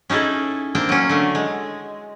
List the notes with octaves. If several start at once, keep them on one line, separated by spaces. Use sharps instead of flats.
C#4 D#4 E4 G#4 A4
A#3 C4 D4 G5
F#3 C#4
D3 A3
G#3